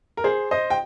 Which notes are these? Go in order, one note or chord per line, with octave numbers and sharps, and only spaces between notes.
A#4
G#4 C5
C5 D#5
G5